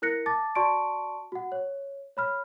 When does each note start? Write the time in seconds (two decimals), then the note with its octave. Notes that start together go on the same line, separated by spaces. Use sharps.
0.02 E4 A#4 F#6 A#6 C#7
0.26 A5 D6 A6
0.55 F#4 D5 A5 C6 C#6 D7
1.32 F#4 F#5
1.52 C#5
2.17 C#5 B5 F6